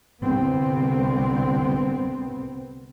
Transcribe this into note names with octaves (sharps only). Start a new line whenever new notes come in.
C2 D3 B3 C4